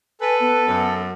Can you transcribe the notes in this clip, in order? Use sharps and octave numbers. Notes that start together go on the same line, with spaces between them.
A4 B4 G#5
B3
F#2